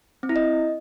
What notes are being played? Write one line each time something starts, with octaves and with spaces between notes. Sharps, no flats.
C4
E4
D#5